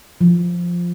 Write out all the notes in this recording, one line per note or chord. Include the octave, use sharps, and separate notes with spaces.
F3